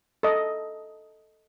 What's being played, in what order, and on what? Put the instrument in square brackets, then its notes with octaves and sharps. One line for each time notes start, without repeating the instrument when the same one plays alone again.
[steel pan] A4 D#5